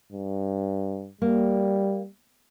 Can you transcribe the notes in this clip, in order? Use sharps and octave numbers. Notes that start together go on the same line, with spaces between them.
G2
G3 A#3